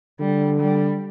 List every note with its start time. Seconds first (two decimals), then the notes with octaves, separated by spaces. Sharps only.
0.19 D3 G3
0.59 G3